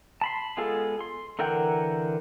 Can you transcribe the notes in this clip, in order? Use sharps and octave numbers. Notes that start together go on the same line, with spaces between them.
A5 B5 C6
G#3 B3 F4 G#4 A4
C6
D3 E3 A#4 F#5 G5